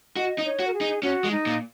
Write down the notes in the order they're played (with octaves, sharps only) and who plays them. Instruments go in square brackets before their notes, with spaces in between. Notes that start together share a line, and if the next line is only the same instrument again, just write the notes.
[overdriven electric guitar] F#4 [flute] D#5
[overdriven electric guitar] D#4
[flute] C#5
[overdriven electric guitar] F#4
[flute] A#4
G#4
[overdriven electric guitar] D#4
[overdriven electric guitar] C#4 [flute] F#4
[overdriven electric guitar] G#3
[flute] D#4
[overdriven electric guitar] A#2